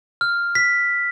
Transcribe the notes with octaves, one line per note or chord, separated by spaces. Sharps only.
F6
B6